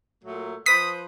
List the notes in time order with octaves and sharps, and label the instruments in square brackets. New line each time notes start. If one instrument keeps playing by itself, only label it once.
[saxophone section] A#2 F#3 A3
[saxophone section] F3 B4 C5 [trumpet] D#6 [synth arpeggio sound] B6